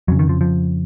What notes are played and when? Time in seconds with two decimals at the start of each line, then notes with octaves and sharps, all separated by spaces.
0.08 F2 C#3 F#3
0.19 D#3
0.29 F3
0.41 F3